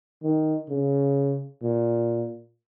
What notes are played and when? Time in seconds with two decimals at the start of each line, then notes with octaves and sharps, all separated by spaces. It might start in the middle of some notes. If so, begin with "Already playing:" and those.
0.23 D#3
0.70 C#3
1.62 A#2